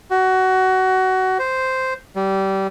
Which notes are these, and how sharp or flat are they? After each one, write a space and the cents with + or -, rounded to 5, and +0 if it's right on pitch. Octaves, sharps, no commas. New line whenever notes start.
F#4 +20
C5 -5
G3 -20